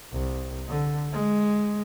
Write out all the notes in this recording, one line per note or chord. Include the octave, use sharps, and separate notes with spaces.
C2
D3
G#3